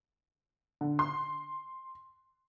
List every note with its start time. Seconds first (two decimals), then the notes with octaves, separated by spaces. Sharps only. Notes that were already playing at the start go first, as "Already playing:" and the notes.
0.81 D3
0.99 C6